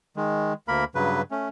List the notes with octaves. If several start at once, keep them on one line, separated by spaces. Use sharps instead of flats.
D#3 G#3
D2 A#3 A#4 B5
G2 C#3 F#3 B4
A3 C#4